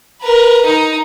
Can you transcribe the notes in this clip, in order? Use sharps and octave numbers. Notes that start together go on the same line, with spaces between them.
A#4 B4
D#4 A#5